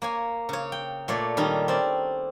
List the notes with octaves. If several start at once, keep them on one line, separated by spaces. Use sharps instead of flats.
A#3 C#5 G#5
C#3 C#5
G5
A#2 A3 C#5 D5
D#3 G3 C#4 D#4
C4 C#4 D5